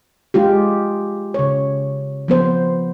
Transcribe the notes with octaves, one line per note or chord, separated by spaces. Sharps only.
G#3 F4 G4
C#3 C#5
F3 B3 C5